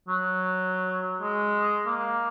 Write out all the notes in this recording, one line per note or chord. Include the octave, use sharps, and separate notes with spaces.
F#3
G#3
A#3